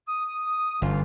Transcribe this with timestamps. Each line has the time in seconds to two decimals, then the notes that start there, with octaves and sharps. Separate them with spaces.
0.08 D#6
0.82 G1 F#2 E3 F4